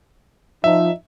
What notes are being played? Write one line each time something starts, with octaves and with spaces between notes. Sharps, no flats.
F3 D#4 E5